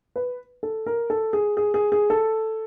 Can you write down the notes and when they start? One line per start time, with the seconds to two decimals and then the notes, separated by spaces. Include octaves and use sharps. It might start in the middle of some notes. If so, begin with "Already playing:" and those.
0.16 B4
0.63 A4
0.86 A#4
1.10 A4
1.33 G#4
1.57 G#4
1.74 G#4
1.92 G#4
2.10 A4